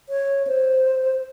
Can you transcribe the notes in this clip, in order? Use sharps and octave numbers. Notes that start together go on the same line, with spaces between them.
C#5
C5